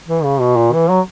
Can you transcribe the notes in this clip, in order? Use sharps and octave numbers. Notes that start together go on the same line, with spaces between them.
E3
C#3
B2
A#2
E3
F#3